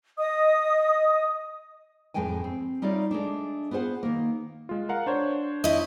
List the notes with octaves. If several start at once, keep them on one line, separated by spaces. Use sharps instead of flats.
D#5 D#6
F2 A2 G#3 G5 G#5
C4
G3 D#4 F4 C#5 D5 E5
G#3 A3 D4
B3 F4 G#4 C5 F#5
D#3 A#3
G#3 F4
A#4 F5 F#5
D4 C5 C#5
E4 D#5